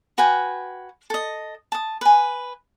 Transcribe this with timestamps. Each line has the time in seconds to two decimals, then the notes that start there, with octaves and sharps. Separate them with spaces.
0.18 F#4 B4 G5 G#5
1.10 A4 D#5
1.72 A5 D#6
2.01 B4 G#5